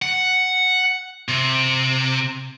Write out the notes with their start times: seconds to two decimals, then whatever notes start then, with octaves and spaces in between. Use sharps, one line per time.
0.02 F#5
1.28 C3